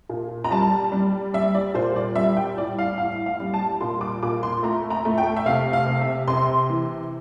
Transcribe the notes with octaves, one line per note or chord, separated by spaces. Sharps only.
A#2
A#5
G3 A5
G3
G3 E5
D5
A#2 C5
D5
G3 E5
G5
A2 D5
F5
A2 F5
F5
G3
A5
A#2 C6
D6
A#2 D6
C6
A3 A#5
A#5
A3
G5
E5
C3 F5
F5
C3
E5
C3 C6
E3